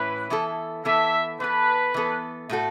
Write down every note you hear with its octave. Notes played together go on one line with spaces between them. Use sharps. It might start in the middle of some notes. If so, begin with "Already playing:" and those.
Already playing: A2 E3 C#4 E4 B4
E3 B3 E4 A4
E3 B3 E4 A4 E5
E3 B3 A4 B4
E3 B3 A4
A2 A3 F#4 A4